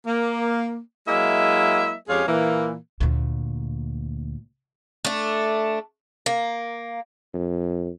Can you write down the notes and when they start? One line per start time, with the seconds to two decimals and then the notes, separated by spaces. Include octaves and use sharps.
0.07 A#3
1.08 F#3 G#3 A#3 E4 D#5 E5
2.08 F2 G#3 C#4 G4 G#4 F5
2.28 A#2 E3 A#3
3.00 D2 A#2
5.05 A3 D4
6.26 A#3
7.34 F2